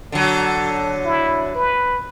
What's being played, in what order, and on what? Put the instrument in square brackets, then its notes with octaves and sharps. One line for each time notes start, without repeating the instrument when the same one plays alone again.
[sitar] D3 F#3 [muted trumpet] A4
[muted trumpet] E4
B4